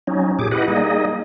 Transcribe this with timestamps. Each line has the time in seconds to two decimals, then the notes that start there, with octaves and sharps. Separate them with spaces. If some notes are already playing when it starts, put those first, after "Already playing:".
0.07 F#3 C#4 D#4
0.39 A#2 G4 G#4 D6
0.51 E4 G4 B4 D#5 F#5
0.68 G3 A#3 D#4 G#4 D#5